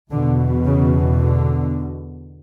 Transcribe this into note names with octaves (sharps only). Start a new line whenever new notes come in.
E2 B2 D3
C#3
D3